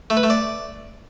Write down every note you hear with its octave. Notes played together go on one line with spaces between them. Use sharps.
A3
B4
A3
D5